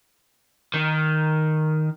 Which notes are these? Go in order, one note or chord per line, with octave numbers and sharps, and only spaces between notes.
D#3